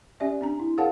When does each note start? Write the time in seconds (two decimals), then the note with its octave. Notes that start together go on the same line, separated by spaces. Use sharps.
0.20 C#4 G4 D5 E5
0.41 C4 D4 A#5
0.60 E4
0.78 G#4 A#4 C#5 F5 F#5 A5